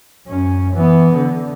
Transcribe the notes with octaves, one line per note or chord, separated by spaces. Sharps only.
F#2 C#4
E3 B3
D3